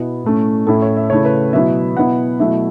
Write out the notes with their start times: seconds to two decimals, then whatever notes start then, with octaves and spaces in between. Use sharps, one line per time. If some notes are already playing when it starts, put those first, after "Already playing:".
Already playing: B2 B3 E4
0.24 A2 A3 C#4
0.67 A2 A3 C#4 E4 A4
0.82 C#5
0.97 E5
1.10 C#3 A3 E4 C#5
1.25 B4
1.53 B2 F#3 B3 E4 E5
1.97 B2 F#3 B3 E4 F#5
2.40 B2 F#3 A3 E4 E5